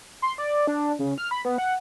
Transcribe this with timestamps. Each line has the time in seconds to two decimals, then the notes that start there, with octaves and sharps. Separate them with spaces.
0.22 C6
0.38 D5
0.67 D4
0.99 C#3
1.18 F6
1.31 B5
1.45 B3
1.58 F#5